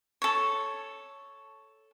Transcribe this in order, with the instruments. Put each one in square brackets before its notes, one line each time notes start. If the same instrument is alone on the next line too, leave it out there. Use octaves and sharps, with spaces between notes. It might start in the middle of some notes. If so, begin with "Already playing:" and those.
[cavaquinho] A4 C#5